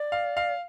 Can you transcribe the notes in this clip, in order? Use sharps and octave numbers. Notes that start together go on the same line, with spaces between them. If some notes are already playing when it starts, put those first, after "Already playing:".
Already playing: D5
F5
F5